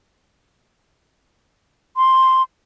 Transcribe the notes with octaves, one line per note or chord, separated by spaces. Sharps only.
C6